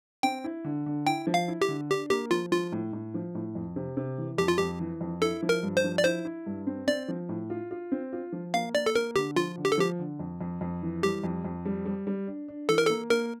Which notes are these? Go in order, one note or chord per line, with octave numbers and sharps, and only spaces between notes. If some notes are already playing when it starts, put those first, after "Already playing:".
C4 G5
E4
D3
D3
E4 G5
F3
F5
E4
G4
D3
D4 G4
A#3 G4
F3 F4
F3 F4
A2
A2
F3
A2
F2
C3
C3
E3
F2 G4
F4
F2 G4
E3
F2
E4 A4
F3
A#4
G2
C5
F3
D5
E4 C5
E4
G2
C4
C4 D5
F3
A2
F4
F4
C4
F4
F3
A#3 F5
A#3 D5
A4
A#3 A#4
D3 G4
F3 F4
D3
G4
A4
F3 G4
D3
F2
F2
F2
E3
G3 G4
F2
F2
G3
G3
G3
D4
D4
E3 A4
A#4
A#3 A4
A#3 A#4